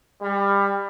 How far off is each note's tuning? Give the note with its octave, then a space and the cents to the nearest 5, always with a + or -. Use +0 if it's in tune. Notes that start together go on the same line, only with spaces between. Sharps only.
G3 +25